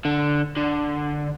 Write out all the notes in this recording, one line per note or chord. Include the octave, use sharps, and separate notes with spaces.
D3
D3